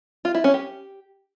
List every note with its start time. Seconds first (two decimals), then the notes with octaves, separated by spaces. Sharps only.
0.25 F4
0.35 E4
0.44 C#4
0.54 G4